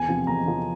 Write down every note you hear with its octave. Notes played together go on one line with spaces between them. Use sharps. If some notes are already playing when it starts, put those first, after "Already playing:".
Already playing: E2 G#5
C3 F3
E2 A#5
C3 F3